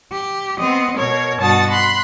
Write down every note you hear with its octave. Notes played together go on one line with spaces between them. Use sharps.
G4
B3 C4 D#5
B2 A#4 C#5
G2 B2 F#4 A5 D#6 A6
B5 C6 F#6